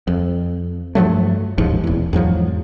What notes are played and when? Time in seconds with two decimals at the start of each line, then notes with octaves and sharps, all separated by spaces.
0.07 F2
0.95 G2 F3 F#3 A3
1.58 A1 D#2 G#2 F3
1.84 D#1 E2
2.13 E2 G#2 F3 F#3